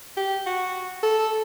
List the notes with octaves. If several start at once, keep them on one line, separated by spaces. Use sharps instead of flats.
G4
F#4
A4